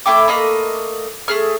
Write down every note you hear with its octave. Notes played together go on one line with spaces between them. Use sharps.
A3 E4 G5 D6
A3 A#3 D#5 B5
A3 G#4 F6